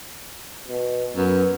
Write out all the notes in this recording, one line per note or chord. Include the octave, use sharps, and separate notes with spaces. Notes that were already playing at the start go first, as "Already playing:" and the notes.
B2
F#2 B3